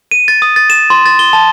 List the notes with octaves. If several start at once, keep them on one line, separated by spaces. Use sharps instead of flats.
D#7
A6
D#6
A6
E7
C6
A6
G7
A5